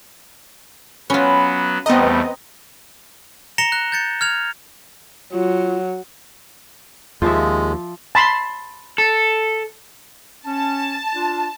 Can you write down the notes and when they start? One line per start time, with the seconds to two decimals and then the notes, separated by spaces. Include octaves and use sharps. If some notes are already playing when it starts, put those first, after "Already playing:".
1.10 F#3 B3 C#4 F4 B4
1.86 E2 G3 A3 B3 C4 D#5 A#5
3.58 A#5 A#6 C#7 E7 F7 G7
3.72 F#6
3.92 G6 A6 C#7
4.21 F6 G#6 F7
5.33 F#3 F4
7.22 D#2 F3 G#3 E5
8.15 A5 B5 C6
8.98 A4
10.45 C#4 A5
11.14 D4 F4